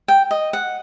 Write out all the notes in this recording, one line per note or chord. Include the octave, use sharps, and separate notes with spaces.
G5
D#5
F#5